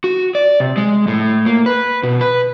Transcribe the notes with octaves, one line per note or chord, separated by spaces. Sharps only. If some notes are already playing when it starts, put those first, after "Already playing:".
F#4
D5
C3
G#3
A2
A#3
B4
B2
B4